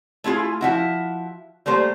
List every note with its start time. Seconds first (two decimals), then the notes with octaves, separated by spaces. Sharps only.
0.24 A3 E4 F4 G#4
0.61 F3 E4 F#4
1.66 G3 A3 A#3 C5